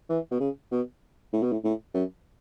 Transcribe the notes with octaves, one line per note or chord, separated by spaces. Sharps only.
E3
B2
C#3
B2
A2
B2
A2
A2
F#2